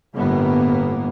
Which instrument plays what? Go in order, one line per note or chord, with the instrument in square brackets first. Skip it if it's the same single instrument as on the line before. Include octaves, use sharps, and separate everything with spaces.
[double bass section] G1 A2 A#3 B3